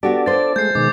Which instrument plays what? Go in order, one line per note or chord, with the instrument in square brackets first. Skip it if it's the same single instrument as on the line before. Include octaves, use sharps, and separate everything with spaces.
[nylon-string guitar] B3 F#4 G4 [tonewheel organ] D4 A4 D5
[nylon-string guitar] F4 C5 [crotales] A6
[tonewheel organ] G#3 A3 [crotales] G6 C7
[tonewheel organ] B2 D#3 G#3 [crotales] D6